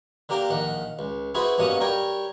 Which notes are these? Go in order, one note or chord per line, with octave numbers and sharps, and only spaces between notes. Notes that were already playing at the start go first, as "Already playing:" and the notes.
D3 A#3 G4 A#4 D6
A#1 D#3 F#5
C#2
E4 F#4 G#4 B4 C5
G2 B2 A#3 C#4 F#5 D#6
G3 A#4 C#5 G5